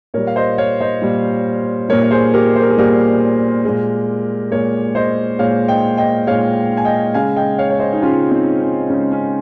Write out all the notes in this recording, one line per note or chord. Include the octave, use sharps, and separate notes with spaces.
A#2 G3 A#4 C#5
F5
C5 D#5
C#5 F5
C5 D#5
A#2 G3
A#2 G3 A#4 C#5
C#5
G#4 C5
G4 A#4
C5
A#4
G#4
A#2 G3 G4 A#4
A#2 G#3
A#2 G#3 A#4 C#5
C5 D#5
A#2 G#3 C#5 F5
D#5 G5
D#5 G5
A#2 G#3 C#5 F5
G#5
D#5 G5
C#3 G#3 F5 G#5
D#5 G5
C#5 F5
C#5
C5 D#5
D#4
C#3 G#3 C#4 F4
C4 D#4
C#4
C#3 G#3 C#4
C#4